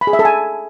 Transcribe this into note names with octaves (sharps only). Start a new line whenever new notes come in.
B5
G#4
E5
A4
G#5